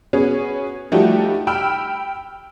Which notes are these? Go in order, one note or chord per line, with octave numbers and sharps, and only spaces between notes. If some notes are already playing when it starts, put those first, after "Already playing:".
B3 C#4 F#4 G#4
F3 G3 A3 D#4 F#4 G4
G5 B5 E6 F6